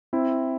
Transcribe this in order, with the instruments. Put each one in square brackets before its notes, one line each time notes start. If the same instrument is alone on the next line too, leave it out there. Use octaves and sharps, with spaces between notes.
[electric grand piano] C4 E4